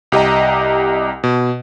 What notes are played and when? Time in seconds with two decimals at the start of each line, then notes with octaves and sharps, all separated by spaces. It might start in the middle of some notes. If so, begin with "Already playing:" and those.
0.12 C2 G4 D#5 A#5
1.24 B2